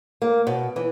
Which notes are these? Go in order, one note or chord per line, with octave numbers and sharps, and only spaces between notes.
A#3
B2
E3